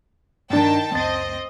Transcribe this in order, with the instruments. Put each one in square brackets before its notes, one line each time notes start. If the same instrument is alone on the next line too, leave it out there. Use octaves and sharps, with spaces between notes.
[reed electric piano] G2 D4 [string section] D#3 G5 A5
[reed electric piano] C#2 F#2 A6 [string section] C4 D#5